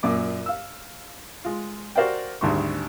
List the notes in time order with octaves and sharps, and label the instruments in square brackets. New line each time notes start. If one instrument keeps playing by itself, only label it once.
[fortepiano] F#2 A#2 D6
F5 E6
G#3 F4
F#4 A#4 C5 D5 F5 G5
G#1 D2 G3 C6 C#6